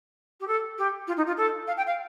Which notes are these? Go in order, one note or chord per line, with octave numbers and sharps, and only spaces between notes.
G4
A4
G4
F4
D#4
F4
A4
F5
G5
F5